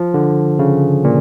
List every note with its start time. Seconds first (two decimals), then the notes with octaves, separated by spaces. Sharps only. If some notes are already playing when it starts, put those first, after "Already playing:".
Already playing: F3
0.14 D3
0.59 C#3
1.04 A#2